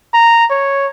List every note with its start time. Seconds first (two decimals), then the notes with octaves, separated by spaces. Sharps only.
0.14 A#5
0.50 C#5